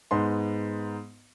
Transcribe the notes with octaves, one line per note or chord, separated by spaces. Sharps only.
G#2 G#3 B3 D#4 C6